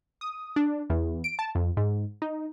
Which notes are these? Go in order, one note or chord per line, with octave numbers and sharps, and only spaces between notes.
D#6
D4
E2
D7
A5
F2
G#2
D#4